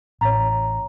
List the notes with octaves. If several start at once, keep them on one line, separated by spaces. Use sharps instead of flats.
A1 C#5 A#5